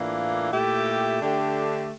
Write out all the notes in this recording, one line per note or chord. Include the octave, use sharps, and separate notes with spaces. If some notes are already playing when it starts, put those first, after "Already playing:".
Already playing: A2 E3 A#3 D4 F4
A#2 A3 E4 G4
D3 A3 D4 G4